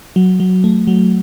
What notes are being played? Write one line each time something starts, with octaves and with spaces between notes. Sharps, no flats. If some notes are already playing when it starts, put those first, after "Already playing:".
F#3
F#3
A3
F#3